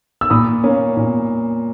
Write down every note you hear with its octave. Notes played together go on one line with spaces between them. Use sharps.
E6
A#2 B5 D#6
A#3 C#4
A#2